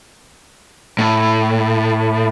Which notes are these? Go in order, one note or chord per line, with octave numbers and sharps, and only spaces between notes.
A2